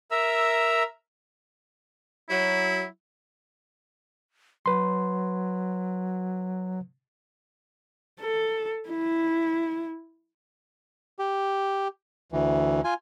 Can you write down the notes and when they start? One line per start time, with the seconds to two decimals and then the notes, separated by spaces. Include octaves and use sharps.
0.11 A#4 E5 A#5 E6
2.30 F#3 E4
4.66 F#3 B4 C6
8.21 A4
8.89 E4
11.19 G4
12.32 D2 E3
12.84 F4 G#5